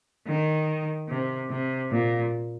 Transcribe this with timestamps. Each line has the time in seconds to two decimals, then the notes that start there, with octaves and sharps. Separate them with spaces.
0.27 D#3
1.09 C3
1.50 C3
1.91 A#2